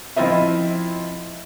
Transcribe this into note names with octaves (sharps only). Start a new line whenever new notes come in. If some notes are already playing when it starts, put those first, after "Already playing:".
F3 C4 E4 F4 D#5 E5